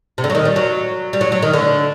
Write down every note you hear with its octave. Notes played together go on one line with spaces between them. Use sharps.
C3
D3
F#3
D#3
G3
F#3
G3
F#3
F#3
D#3
D3